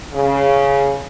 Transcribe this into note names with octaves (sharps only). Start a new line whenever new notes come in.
C#3